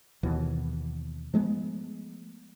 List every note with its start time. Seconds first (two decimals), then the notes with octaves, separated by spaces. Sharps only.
0.23 D#2 B2 E3
1.34 F3 G#3 A3 B3